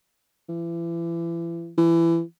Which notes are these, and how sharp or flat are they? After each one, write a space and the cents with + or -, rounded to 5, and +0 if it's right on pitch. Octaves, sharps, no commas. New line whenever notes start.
E3 +35
E3 +20